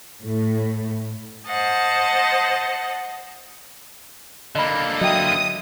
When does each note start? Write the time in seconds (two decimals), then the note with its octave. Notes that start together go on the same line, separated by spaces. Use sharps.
0.24 A2
1.47 C5 D#5 F#5 A5
4.55 D3 A#3 D#5 B5
5.01 F#3 D#5 E5 G5 D#6